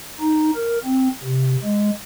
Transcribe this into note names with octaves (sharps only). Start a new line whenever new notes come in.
D#4
A#4
C4
C3
G#3